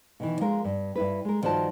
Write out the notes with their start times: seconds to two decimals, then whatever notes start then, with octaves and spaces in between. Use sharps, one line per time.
0.20 B2 D#3 E3
0.40 F3 G#3 A#4
0.64 G2
0.95 G2 E4 B4
1.25 G#3 A#4
1.42 G2 D#3 F3 F#4 C5 A5